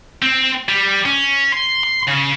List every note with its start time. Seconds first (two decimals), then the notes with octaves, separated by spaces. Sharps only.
0.22 C4
0.68 G3
1.05 C#4
1.52 C6
1.83 C6
2.07 C#3